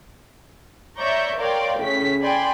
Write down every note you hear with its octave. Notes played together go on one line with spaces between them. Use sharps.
C#5 D5 E5 A#5 C#6 G6
A#4 C#5 D5 F5 G5 C6
A2 C#3 C#4 B6
D5 G5 G#5 B5 C6